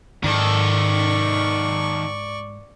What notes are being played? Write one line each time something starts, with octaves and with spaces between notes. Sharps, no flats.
G#2 D#3 A4 D5 C#6